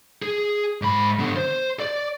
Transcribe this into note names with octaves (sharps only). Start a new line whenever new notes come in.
G#4
G#2 B5
D3 B3
C5
D5